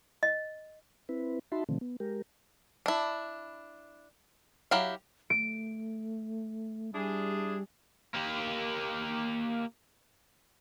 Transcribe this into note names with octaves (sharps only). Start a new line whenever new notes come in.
D#5
C4 E4 B4
D#4 F#4 E5 A5 B5 C6
B2 D3 D#3 F3 A3 C4
B3
G#3 G4 A#4
D4 E4
F#3 E4 G4 F5
A3 D7
G3 D4 E4 G#4
A#3 G4